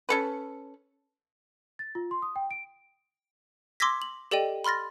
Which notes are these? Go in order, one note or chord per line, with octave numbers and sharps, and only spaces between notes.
C#4 A4 B4
A6
F4
C6
D#6
G5
D7
C6 D6 E6 G#6 A#6 B6
F#7
G4 A4 D5 D#5 G5 D#7
B5 C6 F6 A6 A#6